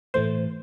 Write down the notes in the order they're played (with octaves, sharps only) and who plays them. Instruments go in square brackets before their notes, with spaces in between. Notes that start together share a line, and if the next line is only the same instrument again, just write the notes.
[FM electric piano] A2 E3 A3 [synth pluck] C5